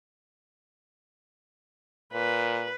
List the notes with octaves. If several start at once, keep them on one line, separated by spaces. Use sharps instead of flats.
A#2 B4